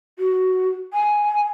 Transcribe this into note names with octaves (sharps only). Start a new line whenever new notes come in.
F#4
G#5